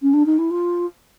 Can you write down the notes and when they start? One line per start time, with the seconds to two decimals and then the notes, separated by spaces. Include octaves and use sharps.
0.01 C#4
0.13 D4
0.25 D#4
0.38 E4
0.50 F4